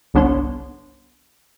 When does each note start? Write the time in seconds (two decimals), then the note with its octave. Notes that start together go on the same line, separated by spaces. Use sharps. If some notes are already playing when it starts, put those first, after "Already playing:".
0.14 G1 C2 B3 D4 C#5 C6